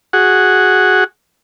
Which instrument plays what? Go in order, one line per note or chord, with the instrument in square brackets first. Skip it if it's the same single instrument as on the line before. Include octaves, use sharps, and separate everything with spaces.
[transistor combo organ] F#4 G#4 F#5